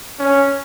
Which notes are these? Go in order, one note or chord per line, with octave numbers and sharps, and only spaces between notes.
C#4